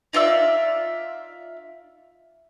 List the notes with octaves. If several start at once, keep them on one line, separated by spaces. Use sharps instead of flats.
D#4 F4 D5 E5